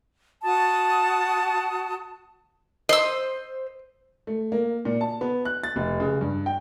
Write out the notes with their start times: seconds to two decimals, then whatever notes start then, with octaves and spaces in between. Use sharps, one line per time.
0.43 F#4 A5 D#6
2.89 C5 D#5 E6
4.27 A3
4.52 A#3
4.85 A#2
5.01 A5
5.21 B3
5.45 F#6
5.64 A6
5.76 F1
6.00 C#3
6.21 G2
6.46 G5